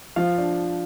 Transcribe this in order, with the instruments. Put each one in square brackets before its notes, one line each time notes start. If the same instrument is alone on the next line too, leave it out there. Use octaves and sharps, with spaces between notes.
[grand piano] F3 F5
D4